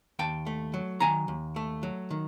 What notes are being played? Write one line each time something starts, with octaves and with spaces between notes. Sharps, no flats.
D#2 G5 A5
A3
F#3
D#3 G#5 A#5
D#2
A3
F#3
D#3